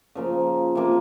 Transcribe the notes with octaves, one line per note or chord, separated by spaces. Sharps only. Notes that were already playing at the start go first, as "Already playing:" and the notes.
C#3 F3 A#3
C3 F3 A#3